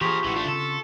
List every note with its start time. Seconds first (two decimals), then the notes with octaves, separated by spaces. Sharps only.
0.01 E3 F3 G4 G#4 A#4 C6 C#6 B6
0.24 A1 E3 F#4
0.36 A3 D4 F4
0.48 C#3 C4 A4